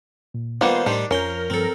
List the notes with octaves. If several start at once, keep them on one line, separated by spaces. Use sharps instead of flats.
A#2
D#3 G3 A#3 B3 F4 C5 F#5
A2 D#3 G3 D4
F2 F3 C#4 A#4 C6 G6
G2 F3 C4 A4